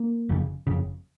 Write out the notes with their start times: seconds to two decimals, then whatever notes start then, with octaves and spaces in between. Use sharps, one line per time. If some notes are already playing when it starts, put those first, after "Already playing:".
Already playing: A#3
0.29 F#1 F2 C#3
0.67 F#1 F2 C#3